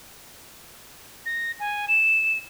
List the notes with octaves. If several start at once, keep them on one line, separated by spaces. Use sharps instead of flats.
A#6
G#5
E7